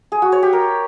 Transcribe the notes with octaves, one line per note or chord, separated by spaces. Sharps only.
G#4
F#4
C#5
G4
A#4